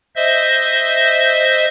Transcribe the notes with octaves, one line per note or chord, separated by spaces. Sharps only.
C5 D#5 E5